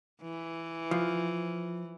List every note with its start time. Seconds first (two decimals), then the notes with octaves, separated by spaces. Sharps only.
0.22 E3
0.91 F3